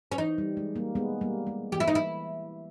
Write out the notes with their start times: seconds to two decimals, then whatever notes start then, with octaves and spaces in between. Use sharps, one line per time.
0.12 C#4
0.18 E3 D#4
0.38 G3
0.57 G#3
0.76 G3 A#3
0.95 G#3 B3
1.21 G3 A#3
1.47 G#3
1.72 E3 G4
1.80 E4
1.88 D#4
1.95 E4